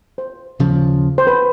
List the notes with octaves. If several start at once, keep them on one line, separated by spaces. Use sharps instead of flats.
C5
D#2 C#3 F3
C5
B4